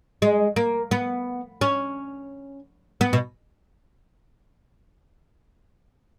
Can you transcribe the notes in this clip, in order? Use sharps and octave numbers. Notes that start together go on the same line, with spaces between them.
G#3
A#3
B3
C#4
B3
B2